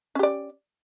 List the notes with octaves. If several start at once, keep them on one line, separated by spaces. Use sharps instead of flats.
C#4 G4 D5